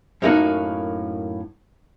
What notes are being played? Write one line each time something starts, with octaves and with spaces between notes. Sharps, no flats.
F#2 A2 A#3 C4 D#4 F#4